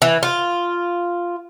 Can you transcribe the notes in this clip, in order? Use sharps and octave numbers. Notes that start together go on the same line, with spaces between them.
E3
F4